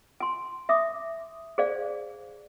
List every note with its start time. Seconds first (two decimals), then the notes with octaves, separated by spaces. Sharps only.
0.20 G#5 C6
0.69 E5 D6 D#6
1.58 G#4 C5 D5 F5